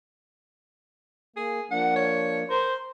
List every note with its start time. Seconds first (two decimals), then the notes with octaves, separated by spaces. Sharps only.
1.36 A#3 G#4
1.71 F3 A#3 D4 F#5
1.96 C#5
2.50 A#4 C5